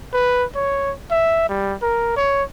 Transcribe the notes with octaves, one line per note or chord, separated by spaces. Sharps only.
B4
C#5
E5
G3
A#4
C#5